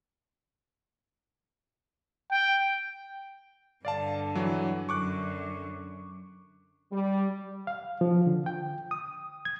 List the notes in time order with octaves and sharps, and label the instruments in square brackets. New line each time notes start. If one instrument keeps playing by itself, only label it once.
[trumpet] G5
[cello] G2 D3 [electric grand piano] D5 F5 A5
[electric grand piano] E3 F#3
[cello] F#2 D3 [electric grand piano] C#6 D6 F#6
[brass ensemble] G3
[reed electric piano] F5
F3
D3
G5
D#6
G#6